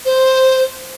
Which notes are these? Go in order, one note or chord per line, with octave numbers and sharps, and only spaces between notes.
C5